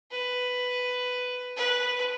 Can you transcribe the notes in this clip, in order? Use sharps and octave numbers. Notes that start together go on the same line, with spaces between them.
B4
B4